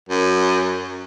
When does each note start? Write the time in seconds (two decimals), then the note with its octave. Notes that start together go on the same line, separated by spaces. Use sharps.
0.09 F#2